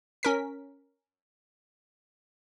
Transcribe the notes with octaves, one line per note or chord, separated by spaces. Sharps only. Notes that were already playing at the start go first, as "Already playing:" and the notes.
C#4 A#4 B6